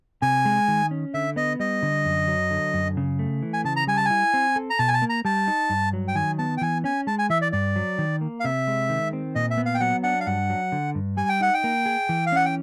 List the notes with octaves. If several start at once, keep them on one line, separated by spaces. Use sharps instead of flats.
C3 G#5
G#3
D#3
C#4
D3 E5
B3 D#5
G3 D#5
D3
F#2
F#3
D3
F#2
C#3
A3
E3
G#5
C#3 A5
A#5
G3 G#5
A5
E4 G#5
C4
A4
A#5
B2 A5
G#5
A5
A#3
A#5
G3 A5
D#4
G2
F#3
G5
D#3 G#5
B3 A5
G5
E3 G#5
C#4 G#5
G#3 A5
G#5
E3 E5
D5
G2 D5
F#3
D#3
A#3
F5
C3 E5
G#3
D#3
C4
A#2 D#5
E5
B3
F5
G5
F#3 F#5
D4 F#5
F5
G2 F#5
F#3
D3
G2
G3 G#5
G5
D#4 F#5
G5
A#3
G#4
E3
F5
C#4 F#5
G5